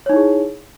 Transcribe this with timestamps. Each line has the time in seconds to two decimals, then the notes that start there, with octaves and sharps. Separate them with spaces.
0.06 C#5
0.09 D#4
0.13 E4
0.16 G#4